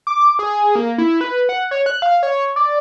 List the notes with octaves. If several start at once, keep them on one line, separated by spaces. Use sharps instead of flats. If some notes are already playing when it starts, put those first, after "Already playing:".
D6
G#4
A#3
E4
B4
F#5
C#5
F#6
F5
C#5
D5